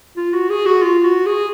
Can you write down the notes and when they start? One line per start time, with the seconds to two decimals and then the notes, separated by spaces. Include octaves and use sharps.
0.17 F4
0.33 F#4
0.49 G#4
0.66 F#4
0.82 F4
1.05 F#4
1.26 G#4